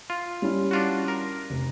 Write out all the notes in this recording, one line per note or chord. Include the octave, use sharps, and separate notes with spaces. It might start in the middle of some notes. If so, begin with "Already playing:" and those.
F4
G3 C#4 E4
D4 F4 F#4
A#4
F1